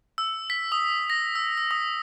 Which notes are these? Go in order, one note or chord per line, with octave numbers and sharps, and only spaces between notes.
E6
B6
D#6
A#6
E6
E6
D#6